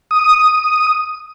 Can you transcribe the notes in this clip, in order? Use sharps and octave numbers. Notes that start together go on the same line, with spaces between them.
D#6